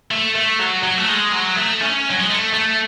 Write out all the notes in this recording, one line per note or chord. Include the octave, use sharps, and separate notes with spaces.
A3
A3
F#3
F#3
A3
G#3
F#3
A3
C#4
F#3
G#3
A3
A3